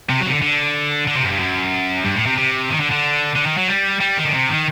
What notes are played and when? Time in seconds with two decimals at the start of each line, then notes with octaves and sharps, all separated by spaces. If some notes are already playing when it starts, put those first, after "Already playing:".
0.09 C3
0.21 F#3
0.27 C3
0.31 D3
0.42 D3
1.07 D3
1.15 C3
1.23 F#2
1.31 G2
1.39 F#2
2.05 G2
2.15 A2
2.26 C3
2.38 C3
2.70 D#3
2.80 D3
2.92 D3
3.35 D3
3.46 D#3
3.57 F#3
3.68 G3
4.00 G3
4.17 D#3
4.25 D3
4.34 C3
4.49 D#3